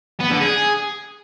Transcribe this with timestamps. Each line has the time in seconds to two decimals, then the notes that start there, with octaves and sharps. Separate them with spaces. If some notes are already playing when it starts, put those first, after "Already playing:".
0.21 B3
0.31 D3
0.41 G#4